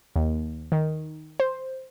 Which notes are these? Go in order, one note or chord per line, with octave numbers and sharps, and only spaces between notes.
D#2
D#3
C5